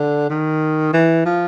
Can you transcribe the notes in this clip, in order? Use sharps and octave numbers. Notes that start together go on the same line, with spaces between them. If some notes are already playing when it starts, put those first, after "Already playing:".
Already playing: D3
D#3
E3
F3